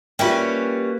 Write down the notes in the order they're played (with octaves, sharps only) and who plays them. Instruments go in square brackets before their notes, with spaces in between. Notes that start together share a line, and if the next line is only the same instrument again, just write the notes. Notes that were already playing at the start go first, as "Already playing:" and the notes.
[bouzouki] G3 C#4 F#4 [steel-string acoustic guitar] A#3 B4 [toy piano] F4 E5 G5